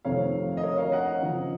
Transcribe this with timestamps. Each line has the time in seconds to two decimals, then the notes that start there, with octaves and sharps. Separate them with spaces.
0.05 F2 C3 D#3 A3 C4 C#5 F5
0.57 D#5
0.63 A#4 C#5
0.78 C#5 F5
0.92 D#5 F#5
1.22 C#3 F3 C4